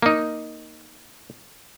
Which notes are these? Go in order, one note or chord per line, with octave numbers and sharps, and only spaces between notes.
A#3 D#4